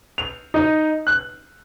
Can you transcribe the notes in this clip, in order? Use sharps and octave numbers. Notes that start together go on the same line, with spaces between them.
F7
D#4
F#6